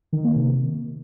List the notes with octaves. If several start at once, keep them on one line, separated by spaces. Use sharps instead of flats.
D#3
A#3
C3